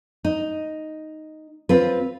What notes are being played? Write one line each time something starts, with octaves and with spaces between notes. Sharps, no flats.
D#4
C4 F4 B4